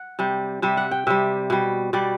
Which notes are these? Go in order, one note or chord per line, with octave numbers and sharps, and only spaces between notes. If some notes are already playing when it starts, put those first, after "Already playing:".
Already playing: F#5
C3 G3
C3 G3 E5
F#5
G5
C3 G3 E5
B2 G3
B2 G3 D5